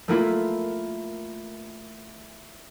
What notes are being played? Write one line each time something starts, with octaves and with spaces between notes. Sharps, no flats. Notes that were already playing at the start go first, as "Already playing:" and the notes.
A3 A#3 E4 F4